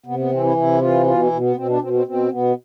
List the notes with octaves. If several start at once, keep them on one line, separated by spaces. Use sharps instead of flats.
C3 B3
B3
E3 C4
E4
C3 E4
E3 F4
B2 F4
E4
B2
B3
B2 C4
D4
B2 C4
C4
B2 C4
B2 B3